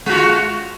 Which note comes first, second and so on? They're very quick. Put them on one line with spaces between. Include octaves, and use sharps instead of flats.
G#3 F#4 F4